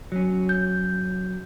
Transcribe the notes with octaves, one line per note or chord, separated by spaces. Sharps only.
F#3 C#4
G6